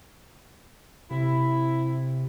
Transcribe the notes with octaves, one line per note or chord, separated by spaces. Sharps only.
C3 E4